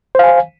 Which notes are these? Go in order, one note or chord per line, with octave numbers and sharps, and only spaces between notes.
C5 F5 G#5